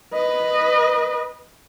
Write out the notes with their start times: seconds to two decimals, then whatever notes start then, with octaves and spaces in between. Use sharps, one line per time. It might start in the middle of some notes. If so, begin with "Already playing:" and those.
0.14 B4 D#5